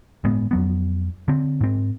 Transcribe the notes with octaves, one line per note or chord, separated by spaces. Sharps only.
G1 A2 G#3 B3
F2 F#3 B3
D3 C4
G#2 C4